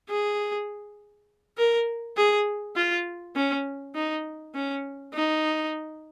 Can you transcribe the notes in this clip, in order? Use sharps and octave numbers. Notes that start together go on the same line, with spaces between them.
G#4
A#4
G#4
F4
C#4
D#4
C#4
D#4